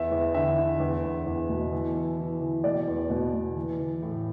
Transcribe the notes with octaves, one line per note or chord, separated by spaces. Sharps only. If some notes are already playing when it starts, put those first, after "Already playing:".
Already playing: E2 E5
E2
D3 E5
D3
E2
E2
E2
B2
E3
E3
E3
E3
B2 D5
E2
B2
B2
E3
E3
A2